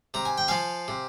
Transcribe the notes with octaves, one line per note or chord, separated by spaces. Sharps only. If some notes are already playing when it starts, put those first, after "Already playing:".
C3 A#5
G#5
G5
F3 F5 G#5
C3